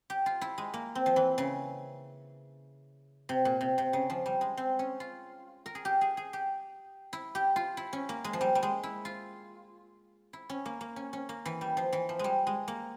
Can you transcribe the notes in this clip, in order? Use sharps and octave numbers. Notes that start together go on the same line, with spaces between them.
G4
F4
E4
G#3
A#3
C4
F3
E3
C#3
C3
A#2
C3
C3
C#3
F3
G3
G#3
C4
C#4
F4
A#4
G#4
G4
G#4
G#4
G4
E4
G4
F4
E4
C#4
A#3
G#3
F3
G3
G3
G#3
E4
F4
E4
C#4
A#3
A#3
C#4
C#4
A#3
E3
G3
F3
E3
F3
G3 G#3
G#3
A#3